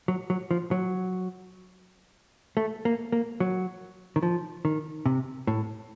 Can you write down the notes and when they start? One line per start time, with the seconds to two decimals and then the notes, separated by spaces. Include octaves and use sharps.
0.08 F#3
0.30 F#3
0.51 F3
0.71 F#3
2.57 A3
2.85 A#3
3.12 A#3
3.40 F#3
4.16 D#3
4.22 F3
4.65 D#3
5.06 C3
5.47 A2